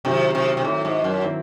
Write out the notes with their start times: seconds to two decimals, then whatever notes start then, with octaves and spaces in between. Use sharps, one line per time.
0.05 C3 D#3 F#3 C4 E4
0.35 C3
0.57 C3
0.65 A2 D#3 F#3 C4 E4
0.85 G#2
1.04 F#2
1.24 D#3 F#3 C4 E4